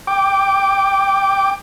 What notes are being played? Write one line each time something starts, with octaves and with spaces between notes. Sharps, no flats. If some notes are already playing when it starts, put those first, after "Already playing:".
G5 D6